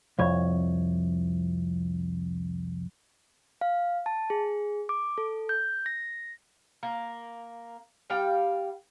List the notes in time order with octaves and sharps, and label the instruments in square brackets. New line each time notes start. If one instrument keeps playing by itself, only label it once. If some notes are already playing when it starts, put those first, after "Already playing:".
[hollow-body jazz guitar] C2 F2 C#5
[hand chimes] F5
A5
G#4
D6
A4
G6
A#6
[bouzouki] A#3
G3 F5 G5